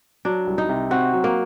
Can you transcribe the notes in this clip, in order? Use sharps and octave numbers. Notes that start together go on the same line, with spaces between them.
F#3 D4
C2
D#4
C3
C4 F#4
F#3
A#3